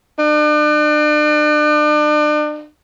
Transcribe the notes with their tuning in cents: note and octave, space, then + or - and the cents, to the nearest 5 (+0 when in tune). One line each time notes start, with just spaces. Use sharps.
D4 +40